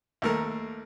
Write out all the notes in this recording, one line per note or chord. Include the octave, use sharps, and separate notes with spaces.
D#2 A3 A#4